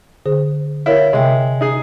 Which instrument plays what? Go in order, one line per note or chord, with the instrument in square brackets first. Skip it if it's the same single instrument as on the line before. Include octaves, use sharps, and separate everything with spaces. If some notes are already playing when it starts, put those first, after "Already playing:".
[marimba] D3 G#4 C5
[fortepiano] E4 [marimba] A#4 C#5 F5
[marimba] C3 E5 G5 [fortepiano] G#3
[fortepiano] D#4 G#4